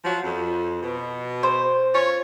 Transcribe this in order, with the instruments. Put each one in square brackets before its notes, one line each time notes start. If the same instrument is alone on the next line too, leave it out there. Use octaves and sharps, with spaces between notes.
[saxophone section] F3 F#3 F#4
F2
B2
[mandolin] C5
[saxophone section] F4 C#5